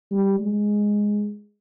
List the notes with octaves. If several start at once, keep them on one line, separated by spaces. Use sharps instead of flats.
G3
G#3